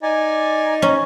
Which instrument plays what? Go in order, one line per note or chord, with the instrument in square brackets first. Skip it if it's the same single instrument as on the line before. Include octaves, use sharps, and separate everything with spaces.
[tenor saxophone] D#4 [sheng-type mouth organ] D5 G#5
[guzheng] C#4